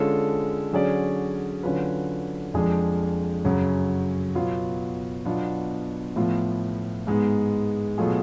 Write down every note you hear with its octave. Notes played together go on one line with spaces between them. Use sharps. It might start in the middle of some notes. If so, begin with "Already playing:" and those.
Already playing: D3 G#3 C#4 F4 A4
D3 F#3 C#4 G#4 D5
D3 F#3 C#4 F4 B4
F2 F3 G#3 D4 G#4
F#2 C#3 F#3
B2 F#3 B3 F4
B2 F#3 B3 D4 F4
A2 F3 B3 F4
G#2 G#3 B3
B2 F#3 A3 F4 G#4